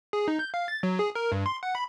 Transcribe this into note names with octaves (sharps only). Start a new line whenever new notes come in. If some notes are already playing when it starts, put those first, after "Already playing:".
G#4
D#4
G6
F5
A6
F#3
G#4
A#4
G2
C6
F#5
B5